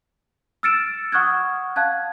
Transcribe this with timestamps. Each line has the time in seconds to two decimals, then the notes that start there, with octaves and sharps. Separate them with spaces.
0.63 E6 F6 A6 C#7 D7 E7
1.12 F#5 C#6 D#6 F6 F#6 G#6
1.76 F5 A5 F#6 G#6